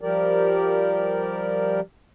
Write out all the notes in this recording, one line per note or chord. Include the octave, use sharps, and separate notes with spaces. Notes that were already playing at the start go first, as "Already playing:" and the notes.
F3 G3 G4 A#4 D5